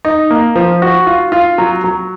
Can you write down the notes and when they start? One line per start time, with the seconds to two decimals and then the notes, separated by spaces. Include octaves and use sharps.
0.05 D#4
0.31 A#3
0.56 F3
0.82 F#4
1.06 F4
1.32 F4
1.58 F#3
1.84 F#3